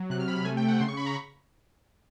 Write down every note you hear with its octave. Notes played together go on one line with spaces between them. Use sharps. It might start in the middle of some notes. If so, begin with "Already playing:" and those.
Already playing: F#3
C3 F#6
F6
C3 B5
A3 G#5
G5
A3
F#5
C#3 C6
C#6
C#3 B5
A#5